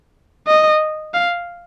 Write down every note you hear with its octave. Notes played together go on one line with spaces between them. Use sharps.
D#5
F5